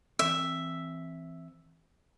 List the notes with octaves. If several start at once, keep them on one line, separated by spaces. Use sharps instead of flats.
E3 C4 E5